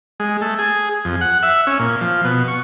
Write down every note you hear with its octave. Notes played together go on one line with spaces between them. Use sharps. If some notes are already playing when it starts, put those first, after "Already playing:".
G#3
A3
G#4
F2
F#5
E5
C#4
A#2
F3
B2
C#6